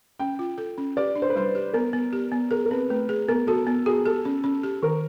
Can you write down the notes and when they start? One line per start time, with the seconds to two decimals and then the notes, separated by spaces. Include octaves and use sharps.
0.19 C#4 G5
0.39 F4
0.58 A4
0.78 C#4
0.97 G4 D5
1.15 D4
1.22 C5
1.30 B4
1.36 G3 C5
1.55 G4
1.73 B3 A#4
1.93 B3
2.13 G4
2.32 B3
2.51 G#4 A#4
2.66 A#4
2.71 C4 B4
2.90 A3 B4
3.09 G#4
3.29 B3 A#4
3.47 F#4 A4
3.67 B3
3.86 F#4 G#4
4.06 G4 A4
4.25 C#4
4.44 C#4
4.63 G4
4.83 D#3 A#4